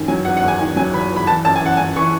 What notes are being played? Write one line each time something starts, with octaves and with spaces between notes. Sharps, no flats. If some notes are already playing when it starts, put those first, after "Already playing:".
Already playing: F#2 D#3
F#3 G#5
E2 F#5
F#5
E2
G#5
D#3 G#5
F#3 G#5
E2 B5
E2
B5
E3 A5
F#2 A5
G#5
E3 F#5
F#2 G#5
E3 C#6